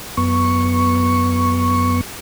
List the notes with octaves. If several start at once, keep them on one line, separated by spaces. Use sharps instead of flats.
F#2 B3 C#6